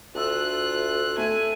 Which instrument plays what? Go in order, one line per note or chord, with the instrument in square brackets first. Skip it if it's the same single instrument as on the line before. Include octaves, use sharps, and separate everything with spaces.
[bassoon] D2 [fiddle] F4 F#6 [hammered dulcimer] G#4 A4 E5
[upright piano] A3 [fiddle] G#5